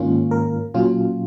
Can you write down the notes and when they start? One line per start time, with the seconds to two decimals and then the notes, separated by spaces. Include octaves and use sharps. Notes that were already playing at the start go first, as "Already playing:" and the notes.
Already playing: G#2 D#3 A#3 C#4 F4
0.31 A#4
0.74 A#2 F#3 C#4 F4